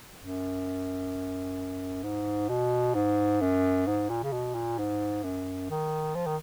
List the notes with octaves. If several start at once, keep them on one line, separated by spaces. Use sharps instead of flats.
F#2
G#2
B2
G#2
F#2
G#2
A#2
C#3
B2
A#2
G#2
F#2
D#3
F3
D#3